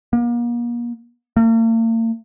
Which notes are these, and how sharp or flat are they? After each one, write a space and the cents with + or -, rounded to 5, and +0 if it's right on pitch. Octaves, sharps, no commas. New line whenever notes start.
A#3 +40
A#3 -45